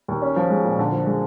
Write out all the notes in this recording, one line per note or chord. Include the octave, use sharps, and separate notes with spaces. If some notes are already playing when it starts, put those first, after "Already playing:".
D#2
C#4
F3
G#3
A#2
D3
F3
G#3